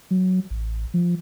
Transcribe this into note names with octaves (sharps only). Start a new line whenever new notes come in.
F#3
A1
F3